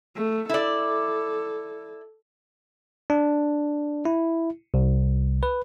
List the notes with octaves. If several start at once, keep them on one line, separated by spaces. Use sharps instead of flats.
A3
E4 A4 D5
D4
E4
C2
B4